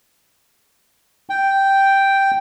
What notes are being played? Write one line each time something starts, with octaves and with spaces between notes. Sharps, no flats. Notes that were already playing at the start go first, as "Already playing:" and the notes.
G5